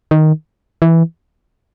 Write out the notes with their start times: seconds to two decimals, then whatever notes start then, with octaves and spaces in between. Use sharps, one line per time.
0.11 D#3
0.82 E3